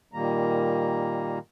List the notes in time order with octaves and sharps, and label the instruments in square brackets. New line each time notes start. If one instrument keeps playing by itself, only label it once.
[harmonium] A#2 D#3 G3 A#3 A#5